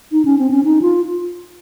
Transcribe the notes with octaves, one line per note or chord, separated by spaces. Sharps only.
D#4
C#4
C4
C#4
D#4
F4